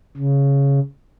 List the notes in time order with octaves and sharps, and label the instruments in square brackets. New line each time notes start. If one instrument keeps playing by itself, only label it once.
[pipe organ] C#3